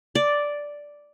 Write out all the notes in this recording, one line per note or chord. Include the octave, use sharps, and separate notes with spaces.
D5